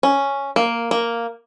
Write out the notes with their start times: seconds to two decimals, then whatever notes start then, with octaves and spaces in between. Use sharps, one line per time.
0.03 C#4
0.56 A#3
0.91 A#3